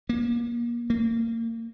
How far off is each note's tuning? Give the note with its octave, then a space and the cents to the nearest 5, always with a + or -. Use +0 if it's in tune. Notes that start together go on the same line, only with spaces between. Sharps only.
A#3 +30
A#3 -30